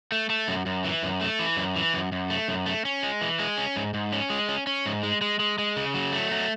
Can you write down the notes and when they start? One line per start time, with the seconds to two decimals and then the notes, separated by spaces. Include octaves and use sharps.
0.12 A3
0.30 A3
0.48 F#2
0.66 F#2
0.85 E3
1.03 F#2
1.21 A3
1.39 E3
1.57 F#2
1.76 E3
1.94 F#2
2.12 F#2
2.30 A3
2.48 F#2
2.66 A3
2.85 C#4
3.03 G#3
3.21 E3
3.39 G#3
3.57 C#4
3.76 G#2
3.94 G#2
4.13 C#4
4.30 G#3
4.49 C#4
4.67 C#4
4.86 G#2
5.03 G#3
5.21 G#3
5.39 G#3
5.58 G#3
5.76 C#3
5.94 F#3
6.12 A3
6.31 F#3